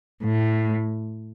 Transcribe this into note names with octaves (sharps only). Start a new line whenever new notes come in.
A2